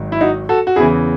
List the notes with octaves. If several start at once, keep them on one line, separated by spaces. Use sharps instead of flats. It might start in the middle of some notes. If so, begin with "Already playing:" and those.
Already playing: G#1 G#2 D#3 F#3
E4
D#4 F#4
F#4 A4
F#4
E2 C#3 E3 E4 G#4